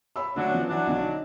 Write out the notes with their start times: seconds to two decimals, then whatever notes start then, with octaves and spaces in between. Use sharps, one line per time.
0.16 C#5 B5 E6
0.36 D3 F#3 A3 D4
0.51 F3 B3 C#4
0.68 E3 F#3 D4
0.87 B1 D3
1.00 D#4